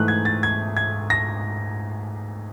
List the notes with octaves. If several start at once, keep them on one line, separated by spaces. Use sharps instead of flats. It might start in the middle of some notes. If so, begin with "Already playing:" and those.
Already playing: G#2 E3 A3 F#6
G#6
A6
G#6
G#6
A#6